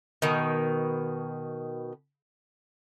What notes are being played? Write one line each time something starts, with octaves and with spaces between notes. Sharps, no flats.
B2 D#3